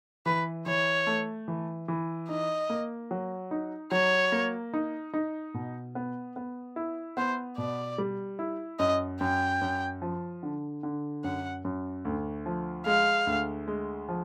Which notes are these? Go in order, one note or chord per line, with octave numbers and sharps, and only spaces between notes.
E3 B4
E3 C#5
A3
E3
E3
D#4 D#5
A#3
F#3
D#4
F#3 C#5
A#3
D#4
D#4
B2
B3
B3
E4
B3 C5
B2 D5
G3
E4
F#2 D#5
F#2 G5
F#2
F3
D3
D3
F#2 F#5
F#2
D2
F3
G#3 F5
D2
G#3
F3